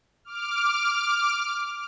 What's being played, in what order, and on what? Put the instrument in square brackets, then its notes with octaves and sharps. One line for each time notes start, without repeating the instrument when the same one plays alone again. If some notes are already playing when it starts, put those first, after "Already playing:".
[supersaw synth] D6 F6